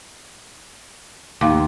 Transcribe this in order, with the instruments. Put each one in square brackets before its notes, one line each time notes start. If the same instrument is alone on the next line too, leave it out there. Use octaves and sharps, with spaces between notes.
[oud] D#2 [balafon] F5 C6 D6